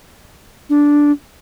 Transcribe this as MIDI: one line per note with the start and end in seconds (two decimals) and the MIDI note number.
0.70 1.12 62